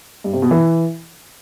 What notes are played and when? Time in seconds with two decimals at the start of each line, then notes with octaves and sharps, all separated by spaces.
0.24 G2
0.33 C3
0.42 B2
0.51 E3